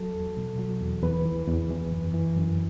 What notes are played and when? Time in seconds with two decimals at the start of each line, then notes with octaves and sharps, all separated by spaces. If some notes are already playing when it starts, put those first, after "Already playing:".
Already playing: F#3 A4
0.14 E2
0.37 B2
0.59 F#3
0.81 E2
1.03 E2 B4
1.25 E3
1.48 E2
1.70 E3
1.92 F#2
2.14 E3
2.36 F#2